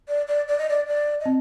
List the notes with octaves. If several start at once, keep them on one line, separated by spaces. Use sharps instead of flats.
D5
D5
D5
D#5
D5
D5
D#5
C4